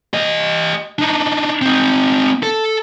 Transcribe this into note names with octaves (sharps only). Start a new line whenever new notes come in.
G4 D#5
D4 D#4
C4 D#4
A4